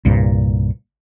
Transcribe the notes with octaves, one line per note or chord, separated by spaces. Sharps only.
C2 G2 A#2